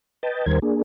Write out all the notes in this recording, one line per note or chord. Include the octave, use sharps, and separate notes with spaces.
B4 D#5 G5 A5
D#2 D#3 G3 A#4 C5 G#6
A#3 D4 G#4